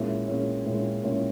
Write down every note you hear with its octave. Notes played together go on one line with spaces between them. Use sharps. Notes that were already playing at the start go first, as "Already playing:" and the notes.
Already playing: A#2 G#3 C#4 E4
A#2 G#3 C#4 E4
A#2 G#3 C#4 E4
A#2 G#3 C#4 E4